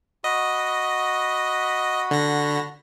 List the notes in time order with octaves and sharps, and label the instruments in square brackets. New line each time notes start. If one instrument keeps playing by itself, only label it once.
[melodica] F#4 F#5 B5 [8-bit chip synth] D#5
[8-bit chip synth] D3 A#6